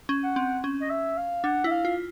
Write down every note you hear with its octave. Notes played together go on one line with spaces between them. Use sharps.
C#4
F#5
C4
C#4
D#5
E5
F5
D4 F#5
E4 E5
F5
F4